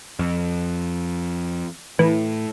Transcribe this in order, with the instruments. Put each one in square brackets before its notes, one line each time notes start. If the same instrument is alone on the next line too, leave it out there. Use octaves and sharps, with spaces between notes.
[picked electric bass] F2
[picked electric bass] A2 [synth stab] E3